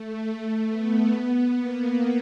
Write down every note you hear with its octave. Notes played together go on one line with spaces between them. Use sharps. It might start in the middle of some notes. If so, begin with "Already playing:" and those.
Already playing: A3
B3
A#3